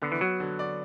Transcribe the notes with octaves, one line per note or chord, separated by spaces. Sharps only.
D3 B3
E3
F#3 F#4
D3
D5